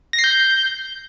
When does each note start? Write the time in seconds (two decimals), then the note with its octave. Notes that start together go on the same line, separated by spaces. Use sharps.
0.13 A#6
0.19 C7
0.24 G6